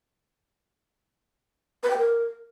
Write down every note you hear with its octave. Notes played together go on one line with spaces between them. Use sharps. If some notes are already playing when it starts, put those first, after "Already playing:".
B4
G5
A#4